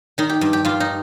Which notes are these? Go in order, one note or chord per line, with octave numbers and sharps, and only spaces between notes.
D#3 D#4
G4
G2
G4
G2 F4
D#4